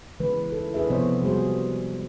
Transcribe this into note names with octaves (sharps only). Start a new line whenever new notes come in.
C#3 E3 G#3 B4
D#4 E4 A4
D4 G#4 B4 E5
C3 F3 B3 C5 C#5 D#5
G3 G#3 F#4 G#4 C5